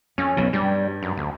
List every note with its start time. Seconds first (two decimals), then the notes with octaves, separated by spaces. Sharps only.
0.18 F2 C#4
0.37 B1 B2
0.53 G2 G3
1.03 F#2
1.17 D2